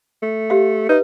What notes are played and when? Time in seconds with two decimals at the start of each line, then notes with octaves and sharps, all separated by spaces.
0.23 A3
0.50 G4 E5 F5
0.89 D#4 B4 E5